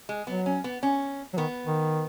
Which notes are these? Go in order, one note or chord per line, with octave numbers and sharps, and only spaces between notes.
G#3
F#3 B3
C#4
B3
C#4
F#3
D#3 B3
D#3